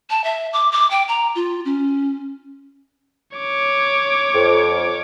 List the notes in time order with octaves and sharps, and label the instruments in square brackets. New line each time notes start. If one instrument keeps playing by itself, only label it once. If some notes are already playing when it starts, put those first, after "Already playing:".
[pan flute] A5
E5
D6
D6
G5
A#5
F4
C#4
[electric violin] C#5 D6
[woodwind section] F2